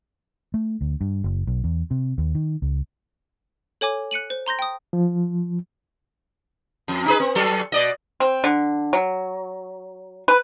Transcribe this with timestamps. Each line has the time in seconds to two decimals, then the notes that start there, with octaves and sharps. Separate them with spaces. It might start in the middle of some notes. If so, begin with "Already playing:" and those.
0.54 A3
0.81 D2
1.01 G2
1.24 F#1
1.47 B1
1.64 E2
1.91 C3
2.18 D#2
2.35 D#3
2.62 C#2
3.81 A4 C#5 G#5 D6
4.11 F#6 C#7 D#7 F#7
4.30 C5
4.46 A#5 C6 G6 A#6
4.59 G5 D#6
4.93 F3
6.88 F2
7.06 D#4 G#4 B4
7.20 C4
7.35 F#3 A4
7.72 B2 D5 D#5
8.20 C4
8.44 D3
8.93 F#3
10.28 B4